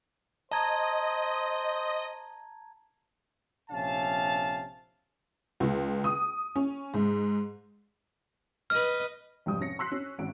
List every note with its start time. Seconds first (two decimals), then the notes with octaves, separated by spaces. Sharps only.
0.51 C5 D#5 A5 A#5 G#6
3.71 A#1 C3 C#4 F5 A5
5.60 C#2
6.04 D#6
6.56 C#4
6.94 G#2
8.70 B4 D#5 F6
9.46 F1 G#2 G3 G5 D#6
9.61 C#4 A#6 C#7
9.79 C6 E6 F#6 B6 C7
9.92 C#4
10.18 G#1 C#4 D7